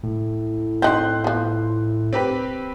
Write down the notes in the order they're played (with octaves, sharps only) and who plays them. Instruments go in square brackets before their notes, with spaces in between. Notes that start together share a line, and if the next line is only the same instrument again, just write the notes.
[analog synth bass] A2
[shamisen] C4 D#4 [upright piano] C6 F#6 G6
[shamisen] F3 B3
[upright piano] C4 G4 B4